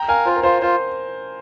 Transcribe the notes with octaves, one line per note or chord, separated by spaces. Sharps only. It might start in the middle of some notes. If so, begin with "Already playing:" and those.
Already playing: G5 A#5
A#4 F5 G#5
F4 C5
A#4
F4 C5
F4 C5